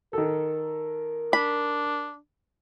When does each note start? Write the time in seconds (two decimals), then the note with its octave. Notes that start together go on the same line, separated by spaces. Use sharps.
0.13 D#3 A4 A#4
1.33 D4 B5